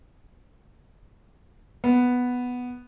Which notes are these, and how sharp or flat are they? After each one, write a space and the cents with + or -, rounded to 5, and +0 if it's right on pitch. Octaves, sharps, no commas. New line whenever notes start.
B3 +0